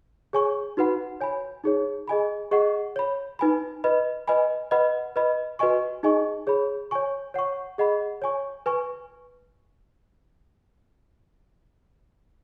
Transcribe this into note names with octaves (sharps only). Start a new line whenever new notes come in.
G#4 C#5 G#5 C#6
D#4 F#4 B4 F#5 B5
C#5 G#5 B5
D#4 G#4 C#5
G#4 D#5 G#5 B5
G#4 D#5 F#5 C#6
C#5 B5
D#4 B4 G#5 B5
B4 D#5 B5
B4 D#5 G#5 B5
B4 D#5 F#5 B5
B4 D#5 B5
F#4 B4 D#5 G#5 C#6
D#4 G#4 D#5 G#5 C#6
G#4 C#5 B5
C#5 G#5 C#6
C#5 F#5 C#6
G#4 D#5 F#5 B5
C#5 G#5 C#6
B4 G#5 C#6